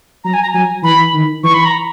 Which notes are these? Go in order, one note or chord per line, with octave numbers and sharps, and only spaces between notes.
F#3 A#5
G#5
A#5
F#3 G#5
E3 B5
D#3
E3 C#6
B5
A#5